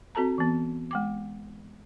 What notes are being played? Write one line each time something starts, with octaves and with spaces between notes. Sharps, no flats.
C4 F#4 A4 A5 A#5
E3 B3
G#3 G5 D6